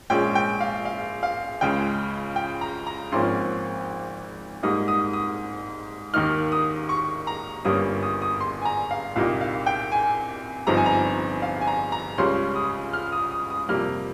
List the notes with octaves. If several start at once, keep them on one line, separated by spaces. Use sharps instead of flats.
A#1 A#2 G#3 C#4 G5
G5
F5
F5
F5
C#2 C#3 G#3 G5
G5
A#5
A#5
G#1 G#2 F3 A#3 C#4 C6
G#2 G3 A#3 D#4 D#6
D#6
D#6
D#2 D#3 A#3 D#4 F6
D#6
C#6
A#5
G1 G2 G3 A#3 C#4 D#6
D#6
D#6
C6
G#5
A#5
F5
C2 A#2 G3 A#3 D#4 F5
F5
G5
G#5
G1 G2 F3 C4 D#4 A#5
G#5
A#5
F5
G#5
A#5
A#5
C#2 C#3 G3 C#4 C6
D#6
F6
D#6
D#6
D#6
F2 C3 G3 A#3 F6